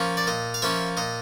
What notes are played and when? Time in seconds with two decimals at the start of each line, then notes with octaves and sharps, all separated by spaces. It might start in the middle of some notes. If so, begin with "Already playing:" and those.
Already playing: F3 A#3 C#4
0.17 D5
0.27 A#2 D#5
0.54 F5
0.62 F3 A#3 C#4 E5
0.97 A#2 D#5